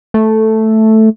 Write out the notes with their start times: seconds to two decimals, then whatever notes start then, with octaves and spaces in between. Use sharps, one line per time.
0.14 A3